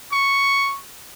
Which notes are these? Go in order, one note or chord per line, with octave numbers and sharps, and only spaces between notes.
C#6